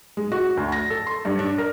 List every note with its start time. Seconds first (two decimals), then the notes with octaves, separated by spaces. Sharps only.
0.17 G#3
0.32 F#4
0.57 D2
0.72 A#6
0.90 A4
1.07 C6
1.25 G2
1.39 D4
1.58 A#4